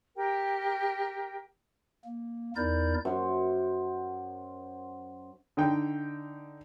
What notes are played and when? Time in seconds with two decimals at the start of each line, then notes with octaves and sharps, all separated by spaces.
0.15 G4 A#4 G5
2.05 A#3
2.56 E2 D#4 E4 A#4 D5 G6
3.05 F#2 C5
5.57 D3 D#4 G5